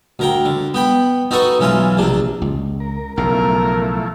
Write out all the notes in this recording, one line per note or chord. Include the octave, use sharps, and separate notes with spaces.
D2 A#4 G5
D3
B3 G5 B5
D#4 F#4 A4 B4 D#5 C#6
B1 E3 C#4 E4 F4
A#1 C3 D4
C#2
A#4
B1 C#3 F3 A3 E4 A#4